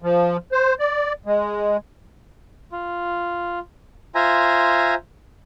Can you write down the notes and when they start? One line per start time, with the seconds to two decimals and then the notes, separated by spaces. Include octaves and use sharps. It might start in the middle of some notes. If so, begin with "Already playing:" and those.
0.02 F3
0.52 C5
0.80 D5
1.26 G#3
2.72 F4
4.15 F4 C5 E5 G#5 A#5